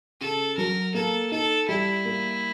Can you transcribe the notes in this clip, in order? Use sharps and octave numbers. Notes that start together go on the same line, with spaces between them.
C#3 A4
F#3 A#4
A#3 A4
D#4 A4
G3 E4
A#3